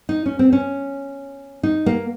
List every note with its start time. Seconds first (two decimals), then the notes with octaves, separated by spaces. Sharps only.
0.09 D#4
0.26 C#4
0.39 C4
0.53 C#4
1.63 D#4
1.86 A#3